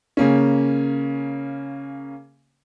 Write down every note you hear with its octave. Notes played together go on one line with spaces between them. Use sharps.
C#3 A#3 C#4